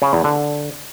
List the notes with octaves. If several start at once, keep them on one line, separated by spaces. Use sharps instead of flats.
C#3
E2
D3